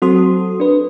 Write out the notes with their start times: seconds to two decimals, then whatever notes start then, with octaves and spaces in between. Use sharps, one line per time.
0.02 F#3 C4 F#4 A4 C6 D#6
0.60 D4 B4